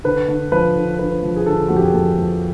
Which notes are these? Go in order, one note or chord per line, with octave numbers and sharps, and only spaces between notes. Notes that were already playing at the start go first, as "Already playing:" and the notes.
D3 B4
D3
F3 B4
D3
D3 B4
F3
G#4
D3 A4
F2 F#4
G4
G#4
F2 A4
F3